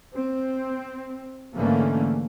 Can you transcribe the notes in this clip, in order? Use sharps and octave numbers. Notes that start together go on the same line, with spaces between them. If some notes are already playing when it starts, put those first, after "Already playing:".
C4
G#2 D3 E3 A3 A#3 C#4